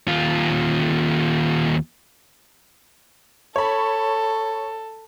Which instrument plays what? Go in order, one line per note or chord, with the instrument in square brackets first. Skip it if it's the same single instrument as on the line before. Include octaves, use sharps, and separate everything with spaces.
[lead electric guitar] D#2 F4
[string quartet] A4 [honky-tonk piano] C#5 B5